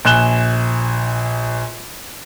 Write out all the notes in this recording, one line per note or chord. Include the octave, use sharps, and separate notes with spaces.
A#1 G#5 F#6 E7 G7